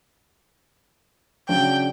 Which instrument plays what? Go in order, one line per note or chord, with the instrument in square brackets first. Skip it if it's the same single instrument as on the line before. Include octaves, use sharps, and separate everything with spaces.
[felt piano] C#3 F#3 D4 [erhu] G5